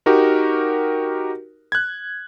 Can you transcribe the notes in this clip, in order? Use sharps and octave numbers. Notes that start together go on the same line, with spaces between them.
D#4 F#4 G4 A#4
F#6 G#6